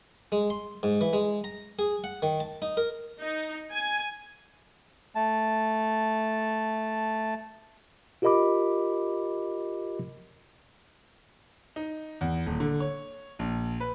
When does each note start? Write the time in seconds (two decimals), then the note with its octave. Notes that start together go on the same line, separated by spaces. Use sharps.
0.32 G#3
0.50 C6
0.83 G#2
1.01 E3
1.13 G#3
1.44 A#5
1.79 G#4
2.04 F#5
2.22 D#3
2.40 A5
2.62 D#4
2.77 A#4
3.20 D#4
3.72 G#5
5.15 A3 A5
8.22 F4 G4 A#4 D#5 B5 D6
11.76 D#4
12.21 E2
12.46 D#1
12.60 D3
12.80 C#5
13.39 A#1
13.80 B4